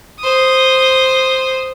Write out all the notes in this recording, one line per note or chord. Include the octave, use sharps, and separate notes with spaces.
C5 D#6